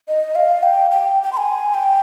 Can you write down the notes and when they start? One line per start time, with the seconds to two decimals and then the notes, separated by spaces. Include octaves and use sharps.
0.08 D#5
0.35 F5
0.63 G5
0.91 G5
1.23 G5
1.33 C6
1.37 G#5
1.74 G5